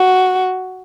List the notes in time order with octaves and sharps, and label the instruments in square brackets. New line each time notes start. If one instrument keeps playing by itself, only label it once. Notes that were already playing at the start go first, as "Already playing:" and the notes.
Already playing: [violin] F#4